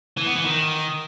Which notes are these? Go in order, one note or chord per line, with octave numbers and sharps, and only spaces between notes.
E3
B3
E3
D#3